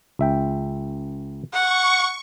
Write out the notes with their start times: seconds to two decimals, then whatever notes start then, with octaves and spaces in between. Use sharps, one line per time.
0.19 C#2 E5 G5
1.53 F#5 C#6